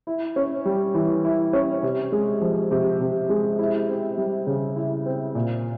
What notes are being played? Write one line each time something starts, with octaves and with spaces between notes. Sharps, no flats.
E4
C#4
G3
E3
E4
C#4
C3
G#3
F3
C3
C3
G#3
E4
C4
G3
C#3
E4
C4
A#2